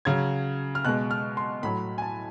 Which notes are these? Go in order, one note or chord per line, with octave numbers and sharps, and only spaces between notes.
C#3 F#3 G#6
F6
B2 G#3 F#6
F6
C6
A2 F#3 B5
G#5
A5